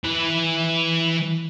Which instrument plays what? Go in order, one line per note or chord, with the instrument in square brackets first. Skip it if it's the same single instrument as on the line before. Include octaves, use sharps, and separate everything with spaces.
[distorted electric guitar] E3 B4